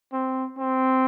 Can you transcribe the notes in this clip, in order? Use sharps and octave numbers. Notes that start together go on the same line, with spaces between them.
C4
C4